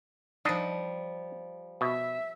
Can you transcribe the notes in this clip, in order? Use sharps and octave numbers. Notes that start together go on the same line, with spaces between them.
F3 G3 D4 D#4 D#5
B2 E5